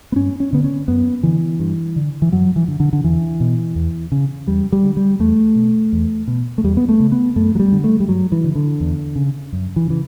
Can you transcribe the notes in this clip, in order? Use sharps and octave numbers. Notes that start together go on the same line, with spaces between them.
B3
G2 C#4
C#4
D3 B3
C#4
F#2 B3
D3 E3
G2
D3
E3
F#2 F#3
E3
D3
D3
D3
E2 E3
B2
E2
C#3
E2 G3
G3
D3
G3
E2 A3
B2
E2
B2
A3
E2 G3
B3
A3
C#3
B3
F#2 A3
F#3
G3
D3
A3
G3
G2 F#3
E3
D3
D3
E2
C#3
F#2
E3
C#3 E3